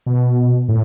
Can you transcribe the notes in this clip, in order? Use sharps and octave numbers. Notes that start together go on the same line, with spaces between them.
B2
A2